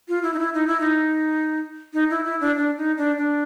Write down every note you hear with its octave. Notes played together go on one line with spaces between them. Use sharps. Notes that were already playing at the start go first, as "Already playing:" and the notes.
F4
E4
D#4
E4
D#4
E4
D#4
D#4
E4
E4
D4
D4
D#4
D4
D4